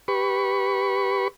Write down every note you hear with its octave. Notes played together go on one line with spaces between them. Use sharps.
G4 B4 B5 C#6